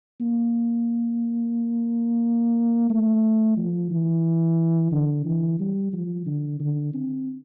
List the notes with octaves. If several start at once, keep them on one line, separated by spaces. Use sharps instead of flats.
A#3
A3
F3
E3
D3
E3
G3
F3
D3
D3
C4